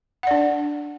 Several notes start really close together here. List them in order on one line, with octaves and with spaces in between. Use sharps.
F#5 D5 D4